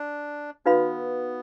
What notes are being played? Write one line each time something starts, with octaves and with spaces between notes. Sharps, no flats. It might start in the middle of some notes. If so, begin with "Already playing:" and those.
Already playing: D4
B3 D#4 F#4 B4 F5 B5